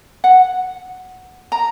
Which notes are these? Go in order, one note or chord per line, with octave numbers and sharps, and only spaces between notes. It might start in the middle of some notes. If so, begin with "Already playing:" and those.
F#5
A#5